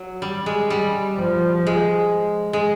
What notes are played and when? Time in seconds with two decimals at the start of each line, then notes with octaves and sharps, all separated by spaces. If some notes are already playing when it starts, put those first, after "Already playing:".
Already playing: F#3
0.22 G3
0.46 G#3
0.70 G3
1.18 F3
1.67 G#3
2.53 G#3